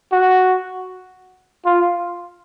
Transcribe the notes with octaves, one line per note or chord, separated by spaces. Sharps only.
F#4
F4